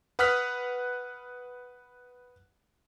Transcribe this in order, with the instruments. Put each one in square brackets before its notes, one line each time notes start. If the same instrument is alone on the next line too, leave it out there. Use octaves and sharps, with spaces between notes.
[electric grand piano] B4 F#5 D#6 F6 F#6 B6